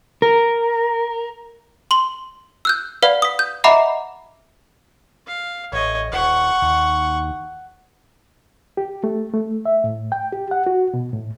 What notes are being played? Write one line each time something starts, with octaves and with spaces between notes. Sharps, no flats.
A#4
C6 F#7 G7
E6 F#6 G6
B4 D5 F5 F#5 B5
D#6 B6
G6
D#5 E5 F#5 A#5 B5 D6
F5
A1 C#5 D#5
D#1 F#5 C#6
D#2
G4
A3
A3
E5
A2
G5
G4
F#5
F#4
B2
A2